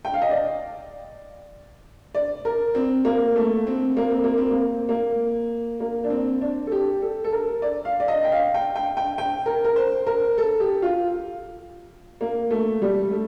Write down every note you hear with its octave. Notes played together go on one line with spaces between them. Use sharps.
G5
F5
D#5
D5
D5
A#4
C4
A#3
A3
C4
A#3
C4
A#3
C4
A#3
A#3
A#3
D4
C4
D4
A4
G4
A4
A4
A#4
D5
F5
D5
D#5
G5
F5
G5
G5
G5
G5
A#4
A#4
C5
A#4
A4
G4
F4
A#3
A3
G3
A3